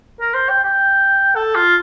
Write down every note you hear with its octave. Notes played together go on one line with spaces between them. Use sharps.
A#4
C5
G5
G5
A4
F4